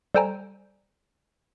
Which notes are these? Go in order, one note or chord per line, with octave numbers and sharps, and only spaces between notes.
G3 A4 C5 G5 G#5 A#5